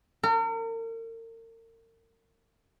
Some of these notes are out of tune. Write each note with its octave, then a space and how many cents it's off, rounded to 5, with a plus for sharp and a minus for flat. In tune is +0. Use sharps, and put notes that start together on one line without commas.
A#4 -40